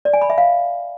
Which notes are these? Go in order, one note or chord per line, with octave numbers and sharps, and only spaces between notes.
D5
G#5
B5
E5
F5